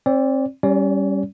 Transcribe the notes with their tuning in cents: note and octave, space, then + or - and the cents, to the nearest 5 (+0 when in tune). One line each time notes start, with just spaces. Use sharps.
C4 +30 D5 -20
G3 +0 C#4 +0 D5 -40